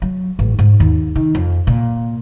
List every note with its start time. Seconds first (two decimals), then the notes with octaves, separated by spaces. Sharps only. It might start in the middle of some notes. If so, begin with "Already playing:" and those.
0.02 F#3
0.39 A1
0.59 G#2
0.80 D#2
1.16 D#3
1.35 F2
1.67 A#2